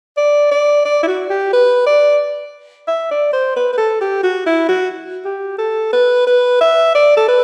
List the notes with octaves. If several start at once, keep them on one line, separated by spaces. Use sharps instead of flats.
D5
D5
D5
E4
F#4
G4
B4
D5
E5
D5
C5
B4
B4
A4
G4
F#4
E4
F#4
G4
A4
B4
B4
E5
D5
A4
B4